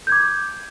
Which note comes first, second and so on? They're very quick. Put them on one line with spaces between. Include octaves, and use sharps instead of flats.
G6 G#6 D6